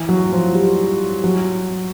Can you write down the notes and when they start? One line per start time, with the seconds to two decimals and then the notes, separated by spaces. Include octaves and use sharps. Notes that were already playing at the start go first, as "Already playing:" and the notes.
Already playing: E3
0.09 F#3
0.32 F3
0.55 G3
1.24 F#3